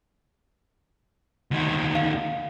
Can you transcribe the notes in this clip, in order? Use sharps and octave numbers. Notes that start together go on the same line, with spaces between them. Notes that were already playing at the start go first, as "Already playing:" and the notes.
D2 D#3
F5